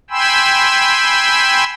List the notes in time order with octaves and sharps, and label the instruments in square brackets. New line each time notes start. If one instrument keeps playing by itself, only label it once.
[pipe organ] G5 G#5 B5 C6 E6